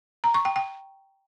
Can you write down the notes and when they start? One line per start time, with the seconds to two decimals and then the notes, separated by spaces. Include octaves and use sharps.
0.24 A#5
0.34 C#6
0.45 G5
0.56 G5